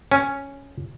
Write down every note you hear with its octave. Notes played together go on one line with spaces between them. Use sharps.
C#4